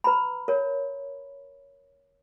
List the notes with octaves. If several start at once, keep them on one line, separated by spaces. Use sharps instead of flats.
B4 A#5 B5
A#4 C#5